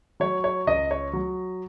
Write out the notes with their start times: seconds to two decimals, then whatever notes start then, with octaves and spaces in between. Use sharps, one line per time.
0.20 F#3 C#5
0.44 C#5
0.67 C#2 D#5
0.91 C#5
1.13 F#3